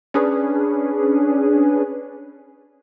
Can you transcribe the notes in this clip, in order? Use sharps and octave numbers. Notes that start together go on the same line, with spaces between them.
C#4 D4 G#4 B4